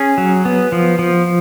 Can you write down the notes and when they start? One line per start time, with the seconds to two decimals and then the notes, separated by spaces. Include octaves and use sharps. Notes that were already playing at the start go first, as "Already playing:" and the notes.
Already playing: C#4 G#4
0.18 F#3
0.45 B3
0.72 F3
0.99 F3